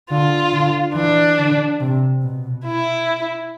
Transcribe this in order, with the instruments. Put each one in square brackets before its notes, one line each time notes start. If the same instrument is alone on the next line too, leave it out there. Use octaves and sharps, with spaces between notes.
[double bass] D3 [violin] F4
[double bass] D3
[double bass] E3 [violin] D4
[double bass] D3
C3
B2
[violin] E4